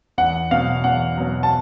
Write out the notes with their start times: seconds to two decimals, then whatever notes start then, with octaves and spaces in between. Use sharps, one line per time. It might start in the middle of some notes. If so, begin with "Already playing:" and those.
0.18 E2 F#5
0.51 B2 F#3 F5
0.84 E2 F#5
1.18 B2 F#3
1.43 A5